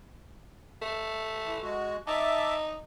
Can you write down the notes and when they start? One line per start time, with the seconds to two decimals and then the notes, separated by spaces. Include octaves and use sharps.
0.82 A3
1.44 E3
1.62 G#3 F#4
2.07 D#4 E5 A5 D6